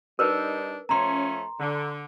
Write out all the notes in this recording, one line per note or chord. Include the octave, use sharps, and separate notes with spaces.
G3 D4 D#4 A#4 B4
F3 A3 C#4 A#5 C6
D3